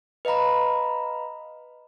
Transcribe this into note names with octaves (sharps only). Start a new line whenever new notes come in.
B4 D#5 F5 A#5 B5